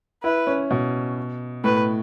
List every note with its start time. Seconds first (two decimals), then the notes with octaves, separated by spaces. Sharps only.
0.24 E4 B4
0.47 C#4
0.70 B2
1.64 A2 B4